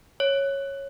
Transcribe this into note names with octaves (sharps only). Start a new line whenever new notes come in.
C#5